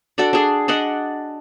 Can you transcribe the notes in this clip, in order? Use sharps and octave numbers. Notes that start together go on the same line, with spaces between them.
D4 F#4 A4 D5
D4 G#4
D4 D5 D#5 F#5